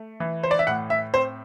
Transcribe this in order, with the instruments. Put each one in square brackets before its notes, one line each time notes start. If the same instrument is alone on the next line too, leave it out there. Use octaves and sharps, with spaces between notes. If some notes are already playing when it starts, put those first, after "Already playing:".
Already playing: [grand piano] A3
E3
C5
D5
E5
A2 F#5
E5
C4 C5